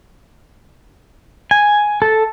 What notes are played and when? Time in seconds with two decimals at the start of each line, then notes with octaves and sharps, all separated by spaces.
1.51 G#5
2.02 A4